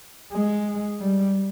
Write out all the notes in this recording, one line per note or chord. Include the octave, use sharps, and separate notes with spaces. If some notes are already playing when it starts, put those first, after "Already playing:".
G#3
G3